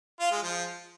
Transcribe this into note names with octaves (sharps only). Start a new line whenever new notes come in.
F4
G#3
F3